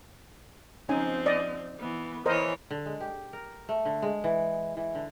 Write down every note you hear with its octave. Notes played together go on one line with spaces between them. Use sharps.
F3 C4 C#4 D#4 G#5
D5 D#5
E3 B3
E3 A#4 C5 C#5 D#5
D3
G#3
G4
A#4
A3
D3
G#3
E3
E3
D3